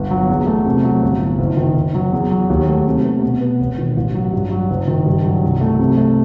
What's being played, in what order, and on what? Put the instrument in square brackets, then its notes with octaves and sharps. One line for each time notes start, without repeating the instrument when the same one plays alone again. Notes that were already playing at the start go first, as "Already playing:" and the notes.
Already playing: [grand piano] G1 B3
F#3
E2
A3
C3
F#3
G1
E3
F#1
D#3
F#1
F#3
E2
F#3
D#2
A3
C3
B3
B2
B3
E1
D#3
A1
F#3
G2
F#3
F#1
D#3
G2
F#3
C2
A3
C3
A3